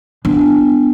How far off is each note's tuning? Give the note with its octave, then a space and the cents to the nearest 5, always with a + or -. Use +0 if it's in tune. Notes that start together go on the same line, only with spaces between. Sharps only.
B3 +10 D4 +0